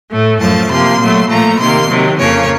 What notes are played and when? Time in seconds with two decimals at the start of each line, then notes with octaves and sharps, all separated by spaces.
0.11 A2 A3
0.40 F#2 F3 A3 A5
0.70 C3 F3 A#3 C6
0.99 A#2 F#3 A3
1.29 A#2 F3 A3 A#5
1.58 C3 D#3 A#3 C6
1.88 C3 D#3 F#3
2.17 F2 C#3 F3 A#3 C#5